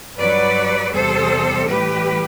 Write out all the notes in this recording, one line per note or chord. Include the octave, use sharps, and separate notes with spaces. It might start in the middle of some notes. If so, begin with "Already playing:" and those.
G2 F#3 B4 D5
E2 C3 G3 A4 C5
A2 E3 G3 G4 B4